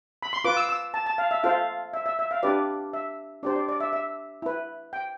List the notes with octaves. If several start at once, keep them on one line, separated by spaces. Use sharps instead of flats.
B5
C6
F4 B4 D6
E6
E6
A5
A5
F5
E5
F4 A4 C5 F5
E5
E5
E5
F5
D4 G4 B4 D5
E5
D4 G4 C5 D5
D5
D5
E5
E5
E4 B4
G5